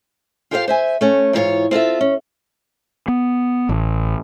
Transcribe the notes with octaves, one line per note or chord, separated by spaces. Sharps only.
F4 G4 A4 C5 E5 F5
C5 E5 G#5
A3 C#4
G#2 E3 E4 F4 C#5
C4 F4 A4 E5
C#4
B3
A1